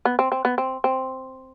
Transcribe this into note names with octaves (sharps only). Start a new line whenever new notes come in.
B3
C4
C4
B3
C4
C4